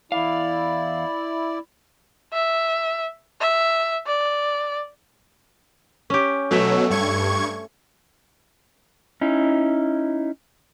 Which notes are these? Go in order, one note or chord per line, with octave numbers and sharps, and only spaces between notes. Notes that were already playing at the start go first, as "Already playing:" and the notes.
E2 E4 D5 F5
E5
E5
D5
C#4 G4
B2 F#3 A3 C#5 E5
G2 C#6 G#6
C#4 D#4 E4